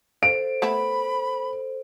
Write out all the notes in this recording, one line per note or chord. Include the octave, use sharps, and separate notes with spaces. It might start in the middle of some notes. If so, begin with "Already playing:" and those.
A4 C5 F5 D7
A3 B3 E4 B5